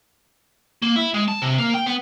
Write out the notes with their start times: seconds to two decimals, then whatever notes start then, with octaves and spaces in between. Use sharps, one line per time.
0.82 A#3
0.96 E4
1.14 G#3
1.28 A5
1.42 C3
1.58 A#3
1.74 G5
1.86 B3